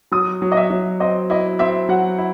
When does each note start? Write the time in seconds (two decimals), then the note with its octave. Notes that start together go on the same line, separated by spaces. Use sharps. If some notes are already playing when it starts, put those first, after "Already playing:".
0.12 F#3 D#6
0.42 F#3
0.52 D#5
0.57 E5
0.71 F#3
1.00 C4 D#5
1.30 E4 D#5
1.59 C4 E5
1.89 F#3 F#5
2.18 E4